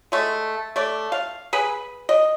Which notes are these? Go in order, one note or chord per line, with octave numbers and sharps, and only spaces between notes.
G#3 A3
A3 D5
F5
G#4 B4 B5
D#5